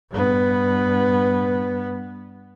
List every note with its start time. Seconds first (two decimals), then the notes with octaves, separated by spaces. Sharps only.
0.11 G2 B3